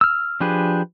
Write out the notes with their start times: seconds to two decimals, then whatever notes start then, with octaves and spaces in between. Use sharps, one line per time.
0.01 E6 F6
0.41 F3 D4 G4 G#4 B4